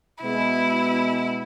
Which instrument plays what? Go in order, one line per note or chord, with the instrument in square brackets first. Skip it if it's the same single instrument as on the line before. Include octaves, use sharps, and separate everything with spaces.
[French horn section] B2 G#3 B3 [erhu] E4